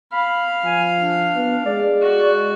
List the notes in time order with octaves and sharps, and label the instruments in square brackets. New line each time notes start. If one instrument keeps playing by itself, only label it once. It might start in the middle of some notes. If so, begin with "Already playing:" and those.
[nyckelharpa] F5 [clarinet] B5
[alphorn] F3 [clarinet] G#5
[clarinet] D4
[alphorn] B3
[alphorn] G#3 [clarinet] D5
[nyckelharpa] F#4